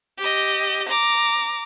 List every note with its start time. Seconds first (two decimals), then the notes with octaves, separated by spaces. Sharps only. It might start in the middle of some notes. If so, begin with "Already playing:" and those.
0.18 G4 D#5
0.89 A#5 D6